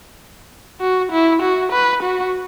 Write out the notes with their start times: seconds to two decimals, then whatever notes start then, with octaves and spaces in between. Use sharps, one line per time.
0.81 F#4
1.12 E4
1.42 F#4
1.72 B4
2.02 F#4